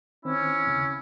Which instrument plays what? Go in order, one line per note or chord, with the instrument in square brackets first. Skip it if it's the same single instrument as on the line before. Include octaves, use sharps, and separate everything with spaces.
[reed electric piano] D#3 C4 [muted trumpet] C#4 [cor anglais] E4
[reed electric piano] D#2 C#3